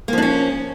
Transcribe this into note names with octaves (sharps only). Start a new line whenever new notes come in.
F3 A#3 C#4 D4